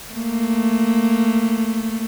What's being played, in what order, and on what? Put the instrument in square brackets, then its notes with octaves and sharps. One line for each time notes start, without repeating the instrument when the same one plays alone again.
[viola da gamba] A3 A#3